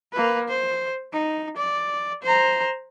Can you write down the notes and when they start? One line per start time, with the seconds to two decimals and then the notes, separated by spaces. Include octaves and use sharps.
0.13 A#3 B4
0.49 C5
1.13 D#4
1.57 D5
2.23 C5 A#5